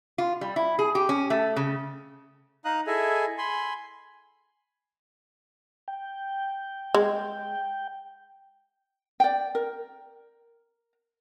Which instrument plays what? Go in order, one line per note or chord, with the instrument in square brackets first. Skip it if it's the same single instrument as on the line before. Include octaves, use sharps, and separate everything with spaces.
[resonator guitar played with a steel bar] F4
G3
E4
G#4
G4
C#4
A3
C#3
[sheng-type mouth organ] D#4 F5 A#5 D#6 F#6
E4 G#4 A4 D#5 E5 G#5
G#5 B5 C6
[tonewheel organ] G5
[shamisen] G#3
[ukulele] D5 G5
A#4